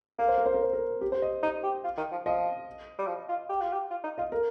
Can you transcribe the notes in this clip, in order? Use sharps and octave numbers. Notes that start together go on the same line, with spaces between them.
A#3 A#4
C5
A#4
C5
A#4
C5
A#4
G4
C5
D#5
D#4 D#5
G4
F4
D#3
F3
F3 D#5
G3
F3
F4
G4
F4
G4
F4
D#4
F4 D#5
A#4